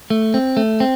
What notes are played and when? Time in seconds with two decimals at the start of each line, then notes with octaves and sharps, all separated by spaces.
0.10 A3
0.34 C4
0.57 A3
0.80 C4